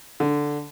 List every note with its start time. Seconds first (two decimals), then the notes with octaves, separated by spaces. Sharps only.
0.20 D3